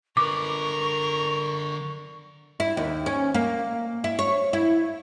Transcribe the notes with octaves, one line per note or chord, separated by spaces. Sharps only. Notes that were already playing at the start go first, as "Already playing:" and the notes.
D3 A#4 B4 C#6 D6
E4
D#2
C#4
A#3
E4
C#5
E4